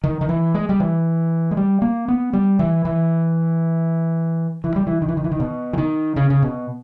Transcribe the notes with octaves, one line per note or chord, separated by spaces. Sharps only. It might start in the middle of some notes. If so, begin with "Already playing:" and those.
D#3
D#3
E3
G#3
G3
E3
G#3
G3
A#3
B3
G3
E3
E3
E3
G3
E3
D#3
E3
D#3
E3
D#3
B2
E3
D#3
C#3
C#3
B2